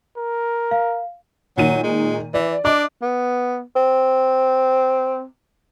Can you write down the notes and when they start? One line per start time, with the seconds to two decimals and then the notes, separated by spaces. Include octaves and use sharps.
0.17 A#4
0.71 F5
1.57 A#2 D#3 F#3 D#7
1.83 G#3
2.34 E3 D5
2.65 D4 D#5 D6
3.02 B3
3.76 C4